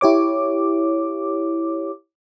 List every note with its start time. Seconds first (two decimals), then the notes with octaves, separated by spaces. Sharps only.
0.01 E4 G4 C#5 D6